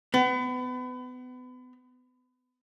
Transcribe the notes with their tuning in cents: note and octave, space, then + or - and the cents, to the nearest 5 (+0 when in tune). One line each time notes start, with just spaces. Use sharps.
B3 +30